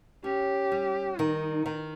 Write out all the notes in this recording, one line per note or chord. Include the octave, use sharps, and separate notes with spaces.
C#4 G4
G3
D#3 D#4
D#3